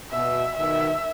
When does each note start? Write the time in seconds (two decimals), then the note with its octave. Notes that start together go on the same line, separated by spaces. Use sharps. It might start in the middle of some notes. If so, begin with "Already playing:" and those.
0.11 B2 E5
0.57 B2 D#3 E5